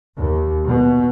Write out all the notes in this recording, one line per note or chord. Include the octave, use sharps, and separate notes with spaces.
D#2
B2